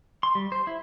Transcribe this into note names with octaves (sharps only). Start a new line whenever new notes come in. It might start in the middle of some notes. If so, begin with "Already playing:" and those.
C6
G3
C5
E4